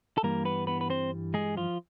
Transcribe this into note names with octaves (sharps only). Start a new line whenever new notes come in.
A4
G2 E3 G3 A#3 A#4
B3 B4
B3 B4
B4
C4 C5
G#3 G#4
F3 F4